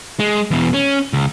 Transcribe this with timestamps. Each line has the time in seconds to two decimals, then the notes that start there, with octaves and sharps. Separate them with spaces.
0.20 G#3
0.51 E2 B2
0.74 C#4
1.13 C#2